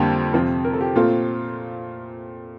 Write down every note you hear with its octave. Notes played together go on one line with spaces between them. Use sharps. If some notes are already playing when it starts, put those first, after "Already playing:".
Already playing: F2 D3 G3 A#3 G4
F2 C3 F3 C4
A#4
A4
G4
A#2 A3 C4 F4